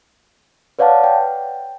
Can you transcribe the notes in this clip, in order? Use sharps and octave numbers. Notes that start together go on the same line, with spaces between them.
B4 C#5 D5 F5 F#5 A5
G5